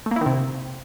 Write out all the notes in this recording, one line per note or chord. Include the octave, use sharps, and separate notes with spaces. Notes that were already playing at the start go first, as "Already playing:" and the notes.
A3
A#3
E4
D#3
C3